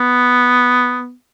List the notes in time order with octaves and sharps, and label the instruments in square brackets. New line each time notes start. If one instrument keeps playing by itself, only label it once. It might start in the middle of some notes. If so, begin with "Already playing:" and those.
Already playing: [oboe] B3